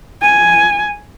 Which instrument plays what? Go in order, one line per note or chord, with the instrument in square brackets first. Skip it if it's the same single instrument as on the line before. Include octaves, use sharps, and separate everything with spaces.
[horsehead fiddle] G#5